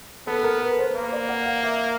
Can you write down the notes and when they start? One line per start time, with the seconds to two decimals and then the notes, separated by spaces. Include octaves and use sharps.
0.27 B3 A4
0.43 A#4
0.62 B4
0.79 C5
0.95 A#3
1.13 D5
1.29 F#5
1.46 F5
1.63 E5